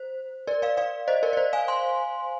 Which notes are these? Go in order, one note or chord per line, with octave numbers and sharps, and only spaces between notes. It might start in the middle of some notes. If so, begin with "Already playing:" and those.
Already playing: C5
A#4 D5
D5 F5
D5 F5
C5 D#5
A#4 D5
D5
C5
F5 G#5
G#5 C6